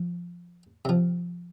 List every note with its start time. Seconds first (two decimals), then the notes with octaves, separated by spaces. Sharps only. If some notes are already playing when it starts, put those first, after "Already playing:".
Already playing: F3
0.85 C3 F3